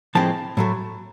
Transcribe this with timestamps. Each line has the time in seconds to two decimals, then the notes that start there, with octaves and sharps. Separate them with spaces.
0.15 A2 F3 G#3 C4 A5
0.57 A2 F#3 A3